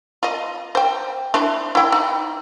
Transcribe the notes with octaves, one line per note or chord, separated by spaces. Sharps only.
F4 D#5
C5 G5
D4 E4 C5
E4 G5
D#4